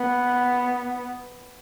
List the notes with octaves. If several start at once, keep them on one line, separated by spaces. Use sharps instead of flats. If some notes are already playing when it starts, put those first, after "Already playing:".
Already playing: B3